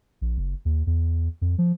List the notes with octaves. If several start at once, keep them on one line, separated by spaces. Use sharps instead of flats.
A#1
F#1
D#2
E2
F2
F3